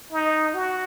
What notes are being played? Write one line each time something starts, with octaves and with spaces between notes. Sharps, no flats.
D#4
F#4